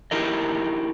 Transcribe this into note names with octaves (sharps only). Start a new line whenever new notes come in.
D#4 E4 G4 A#4 D#5